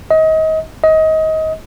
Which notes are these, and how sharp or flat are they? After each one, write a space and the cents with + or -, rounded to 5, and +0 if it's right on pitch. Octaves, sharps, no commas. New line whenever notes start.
D#5 +30
D#5 +25